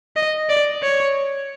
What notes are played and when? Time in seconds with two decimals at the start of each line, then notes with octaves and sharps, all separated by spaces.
0.16 D#5
0.49 D5
0.83 C#5